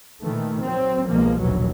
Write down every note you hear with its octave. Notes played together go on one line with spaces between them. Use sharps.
A#2 D#3 E3 A3
F#3 C4
C2 B2 F3 G#3 A#3
F1 A#1 D#2 B2 E3 F#3